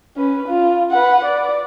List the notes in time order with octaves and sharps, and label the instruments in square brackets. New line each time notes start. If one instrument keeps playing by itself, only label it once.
[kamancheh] C#4 B4
F4
B4 F#5
D5